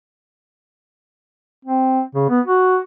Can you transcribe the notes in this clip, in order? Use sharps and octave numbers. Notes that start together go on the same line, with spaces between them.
C4
C#3
B3
F#4